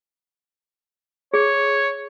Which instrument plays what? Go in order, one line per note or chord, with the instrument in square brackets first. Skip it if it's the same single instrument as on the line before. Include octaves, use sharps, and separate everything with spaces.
[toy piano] G#4 [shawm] C#5